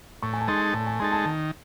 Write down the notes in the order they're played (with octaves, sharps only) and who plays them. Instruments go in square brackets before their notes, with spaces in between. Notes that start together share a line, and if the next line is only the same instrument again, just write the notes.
[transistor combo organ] A2 [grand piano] C#6
[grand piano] G#5
A5
[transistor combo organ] G#3 D#4 A4 [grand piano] C6
[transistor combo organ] A2 [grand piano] A5
[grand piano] G#5
[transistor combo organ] G#3 D#4 A4 [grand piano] C6
[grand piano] A5
[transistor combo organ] D#3